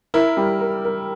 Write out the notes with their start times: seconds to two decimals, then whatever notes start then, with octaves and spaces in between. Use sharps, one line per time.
0.14 E4 A#4
0.37 G3
0.61 A#4
0.85 A#4